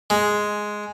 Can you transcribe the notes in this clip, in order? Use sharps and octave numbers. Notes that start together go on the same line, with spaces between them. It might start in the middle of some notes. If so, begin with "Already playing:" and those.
G#3